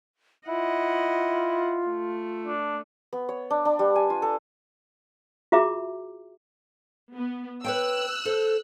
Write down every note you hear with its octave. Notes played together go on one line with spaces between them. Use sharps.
E4 F4 D#5 F#5
A3
D4
B3
C#5
D4
D4
G3
G#5
F4
A4
F4 F#4 G#4 E5 A#5 D6
B3
B4 C#5 G5 E6 F#6
A4 C5